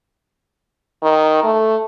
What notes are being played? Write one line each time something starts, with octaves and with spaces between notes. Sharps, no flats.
D#3
A3